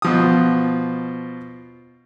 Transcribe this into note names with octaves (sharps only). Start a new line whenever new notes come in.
B2 F3 D#6